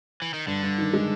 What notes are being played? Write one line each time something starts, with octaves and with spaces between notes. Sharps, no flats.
E3
D#3
G2 D3
G2
D#3
G#3